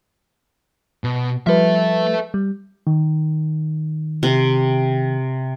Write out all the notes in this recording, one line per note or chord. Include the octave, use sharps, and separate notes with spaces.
B2
F3 G3 A4 B4 E5
G3
D#3
C3